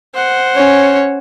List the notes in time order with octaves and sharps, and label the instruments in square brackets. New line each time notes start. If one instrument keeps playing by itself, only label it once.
[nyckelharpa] C5 F#5
[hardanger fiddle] C#4 C#5